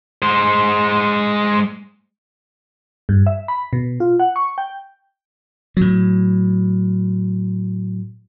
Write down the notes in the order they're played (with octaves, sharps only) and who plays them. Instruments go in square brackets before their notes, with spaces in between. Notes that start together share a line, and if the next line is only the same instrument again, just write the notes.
[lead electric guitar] G#3 C5
[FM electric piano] G2
E5
B5
B2
F4
F#5
C#6
G5
[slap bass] A2 F#3